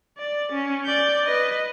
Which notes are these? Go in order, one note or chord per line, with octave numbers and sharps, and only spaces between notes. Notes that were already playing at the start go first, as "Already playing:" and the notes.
D5
C#4
D5 G6
B4 D#5